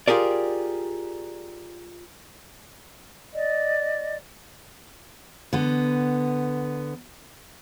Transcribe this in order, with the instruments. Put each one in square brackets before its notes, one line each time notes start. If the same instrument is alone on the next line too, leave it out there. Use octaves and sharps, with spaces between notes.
[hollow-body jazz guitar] F4 G4 G#4 A#4 D5
[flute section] D5 D#5
[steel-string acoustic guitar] D3 B3